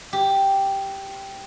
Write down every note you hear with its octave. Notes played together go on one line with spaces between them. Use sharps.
G4